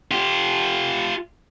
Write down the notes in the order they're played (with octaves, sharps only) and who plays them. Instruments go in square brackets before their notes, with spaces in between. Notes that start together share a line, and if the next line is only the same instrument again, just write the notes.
[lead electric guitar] F4 G4